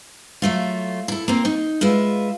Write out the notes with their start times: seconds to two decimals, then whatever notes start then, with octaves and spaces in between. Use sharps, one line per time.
0.42 F#3 A3 F4
1.08 E4 A4
1.28 A#3 C4
1.45 D#4
1.81 G#3 F4 B4 E5